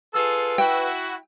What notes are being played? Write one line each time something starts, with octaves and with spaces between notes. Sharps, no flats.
F4 G#4 A4 B4 E6
E4 F#4 G5